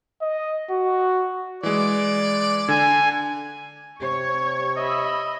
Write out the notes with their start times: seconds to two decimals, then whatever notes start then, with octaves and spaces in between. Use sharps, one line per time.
0.22 D#5
0.70 F#4
1.63 E3 G#3 D5
2.69 D3 G#5
4.02 C3 C#5 C#6 G#6
4.77 D#5 E5 B5